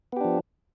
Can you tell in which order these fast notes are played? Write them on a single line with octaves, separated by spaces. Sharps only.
B3 G4 D4 F3